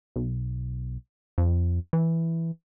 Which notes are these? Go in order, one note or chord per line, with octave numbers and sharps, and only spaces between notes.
B1
F2
E3